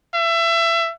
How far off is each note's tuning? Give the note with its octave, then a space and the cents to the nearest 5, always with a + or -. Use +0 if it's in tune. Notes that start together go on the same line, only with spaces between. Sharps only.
E5 +25